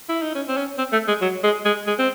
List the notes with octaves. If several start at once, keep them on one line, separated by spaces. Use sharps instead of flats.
E4
D#4
C#4
C4
C#4
C4
A3
G#3
F#3
G#3
G#3
G#3
C4